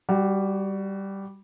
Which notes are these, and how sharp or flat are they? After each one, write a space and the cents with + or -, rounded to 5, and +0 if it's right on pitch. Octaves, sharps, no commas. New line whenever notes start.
G3 +0 F#4 +25